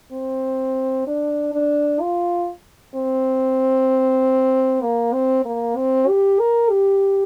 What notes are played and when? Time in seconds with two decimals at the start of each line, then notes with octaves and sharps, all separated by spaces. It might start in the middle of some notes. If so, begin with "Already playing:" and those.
0.12 C4
1.07 D4
1.54 D4
2.01 F4
2.95 C4
4.82 A#3
5.13 C4
5.45 A#3
5.76 C4
6.08 G4
6.40 A#4
6.70 G4